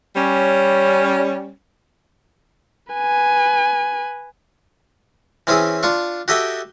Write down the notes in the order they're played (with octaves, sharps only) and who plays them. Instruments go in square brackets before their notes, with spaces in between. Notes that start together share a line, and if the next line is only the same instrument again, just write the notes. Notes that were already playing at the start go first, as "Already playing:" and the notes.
[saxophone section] G3 C#4
[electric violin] B4 G#5
[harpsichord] E3 C4 C#4 E4 G#4
D4 F4 C#6
F#4 G4 A4 D#5 E5 G5